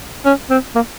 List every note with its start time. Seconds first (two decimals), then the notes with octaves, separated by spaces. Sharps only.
0.25 C#4
0.50 C4
0.75 A#3